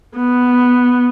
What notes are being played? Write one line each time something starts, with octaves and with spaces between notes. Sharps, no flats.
B3